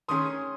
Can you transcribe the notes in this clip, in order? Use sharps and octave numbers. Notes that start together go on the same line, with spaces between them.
D#3 A3 C#4 G#4 C6 D#6